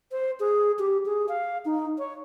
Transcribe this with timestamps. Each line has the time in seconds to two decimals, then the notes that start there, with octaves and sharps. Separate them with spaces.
0.12 C5
0.40 G#4
0.79 G4
1.06 G#4
1.29 F5
1.65 D#4
1.98 C#5